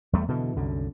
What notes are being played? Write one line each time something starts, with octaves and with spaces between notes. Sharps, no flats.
E2 G3 A3
B2 D3 E3
C2 F#2 D3